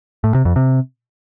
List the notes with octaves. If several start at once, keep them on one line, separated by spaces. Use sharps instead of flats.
A2
C3
F2
C3